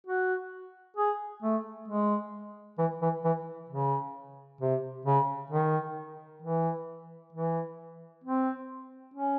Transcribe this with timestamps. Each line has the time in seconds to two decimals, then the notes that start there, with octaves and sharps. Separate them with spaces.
0.07 F#4
0.97 G#4
1.43 A3
1.88 G#3
2.79 E3
3.02 E3
3.24 E3
3.70 C#3
4.61 C3
5.05 C#3
5.50 D#3
6.42 E3
7.33 E3
8.24 C4
9.14 C#4